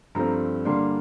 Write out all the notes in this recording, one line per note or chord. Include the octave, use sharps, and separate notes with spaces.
G2 F3 A3 C4 A#5
G2 D3 G3 A#3 D4 C6